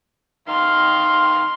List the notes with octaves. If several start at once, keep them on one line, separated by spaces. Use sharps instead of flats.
D#3 F5 C6